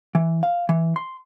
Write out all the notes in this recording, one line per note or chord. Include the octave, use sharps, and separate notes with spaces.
E3
F5
E3
C6